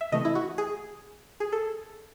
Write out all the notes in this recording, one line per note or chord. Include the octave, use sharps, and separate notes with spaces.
E5
C3 E3 A3 D#5
E4
F#4
G#4
G#4
A4